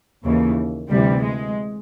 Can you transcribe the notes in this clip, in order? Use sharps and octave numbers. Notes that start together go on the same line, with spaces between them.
D#2 C#3 E3
D2 C3 E3 G3
G#3